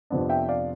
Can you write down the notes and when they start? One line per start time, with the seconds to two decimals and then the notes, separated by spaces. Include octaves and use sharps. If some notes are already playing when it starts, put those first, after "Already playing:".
0.10 F2 C3 F3 B3 D4
0.29 E5 G5
0.49 D5 F5